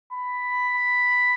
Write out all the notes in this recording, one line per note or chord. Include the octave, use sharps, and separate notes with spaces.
B5